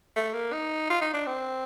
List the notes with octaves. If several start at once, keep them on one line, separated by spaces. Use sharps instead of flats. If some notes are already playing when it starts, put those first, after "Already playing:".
A3
A#3
D#4
F4
D#4
D4
C4